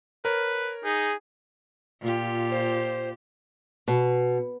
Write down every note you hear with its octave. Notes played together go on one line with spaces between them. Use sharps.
A#4 B4 C#5
D#4 G#4
A#2 F4 G4
C5
B2